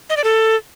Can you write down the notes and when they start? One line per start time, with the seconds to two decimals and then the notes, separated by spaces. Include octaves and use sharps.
0.10 D#5
0.17 D5
0.24 A4